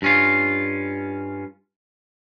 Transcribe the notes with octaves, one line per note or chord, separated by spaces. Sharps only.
G2 C#4 F4